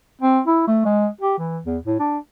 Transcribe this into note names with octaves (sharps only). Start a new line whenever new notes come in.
C4
E4
A3
G#3
G4
E3
E2
A2
D4